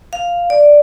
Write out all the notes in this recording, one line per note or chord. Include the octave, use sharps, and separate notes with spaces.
F5
D5